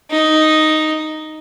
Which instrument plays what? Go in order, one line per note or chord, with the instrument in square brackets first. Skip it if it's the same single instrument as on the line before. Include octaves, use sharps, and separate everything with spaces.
[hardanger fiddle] D#4